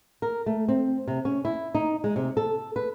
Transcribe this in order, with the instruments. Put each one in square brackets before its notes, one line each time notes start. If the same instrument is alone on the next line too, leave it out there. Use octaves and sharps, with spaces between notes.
[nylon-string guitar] A#4
A3
C4
C3
C#4
E4
D#4
G#3
C3
A4
B4